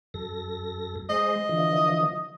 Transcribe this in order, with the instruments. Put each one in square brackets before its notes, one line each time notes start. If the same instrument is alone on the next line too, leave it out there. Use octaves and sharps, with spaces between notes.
[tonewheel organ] F#2 A4 A#6
[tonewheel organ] G#3 C5 [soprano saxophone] D#5
[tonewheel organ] D3 E3 F3